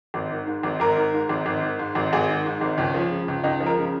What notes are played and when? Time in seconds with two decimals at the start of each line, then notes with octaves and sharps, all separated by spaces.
0.14 G#1
0.31 D#3
0.47 G#2
0.63 G#1
0.80 G#1 A#4
0.98 D#3
1.14 G#2
1.29 G#1
1.46 G#1
1.62 D#3
1.79 G#2
1.95 G#1
2.13 G#1 G#4
2.29 D#3
2.46 G#2
2.61 G#1
2.78 C#2 C#4
2.94 F3
3.11 C#3
3.28 C#2
3.44 C#2 D#4
3.60 F3
3.66 A#4
3.78 C#3